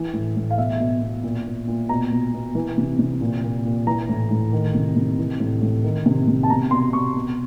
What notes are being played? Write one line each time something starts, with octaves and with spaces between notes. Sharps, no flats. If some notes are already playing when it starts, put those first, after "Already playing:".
Already playing: E3
A2
A2
F5
B2 E5
B2
B2
A#2
A#2
A#2
B2 A#5
B2
B2
E3
C3
C3
A#2
A#2
A#2
E3 A#5
A2
A2
D#3
C3
C3
E3
A2
A2
D#3
C3
C3
A5
B2 A#5
B2 C6
B2 C#6
B2